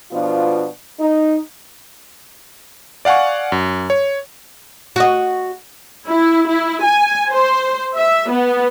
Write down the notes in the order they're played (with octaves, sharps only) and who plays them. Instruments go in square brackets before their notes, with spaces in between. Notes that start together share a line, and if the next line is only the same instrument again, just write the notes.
[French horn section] B2 F3 B3 D4 F4
D#4
[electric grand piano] D5 F5 F#5 G#5 C#6
F#2
C#5
[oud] F#4 D#5
[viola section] E4
E4
G#5
C5
E5
B3